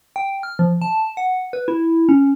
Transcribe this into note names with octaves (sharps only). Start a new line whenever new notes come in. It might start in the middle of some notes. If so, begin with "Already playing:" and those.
G5
F6
F3
A5
F#5
B4
E4
C#4